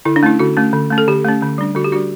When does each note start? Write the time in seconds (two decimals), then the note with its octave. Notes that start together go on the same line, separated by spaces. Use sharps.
0.05 D3 E4
0.16 D4
0.23 A3 C#4 E4
0.39 D3 F#4
0.57 A3 C#4
0.73 D3
0.90 A3 C#4
0.98 A4
1.08 D3 G4
1.25 A3 C#4
1.42 D3
1.58 G3 D4
1.75 D3 F#4
1.84 G4
1.92 G3 D4 F#4